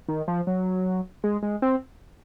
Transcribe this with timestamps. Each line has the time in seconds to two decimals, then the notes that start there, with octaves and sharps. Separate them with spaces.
0.09 D#3
0.28 F3
0.47 F#3
1.24 G#3
1.43 G#3
1.62 C4